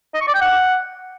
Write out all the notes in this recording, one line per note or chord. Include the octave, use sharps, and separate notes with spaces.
D#5
C#6
D5
G5
F#5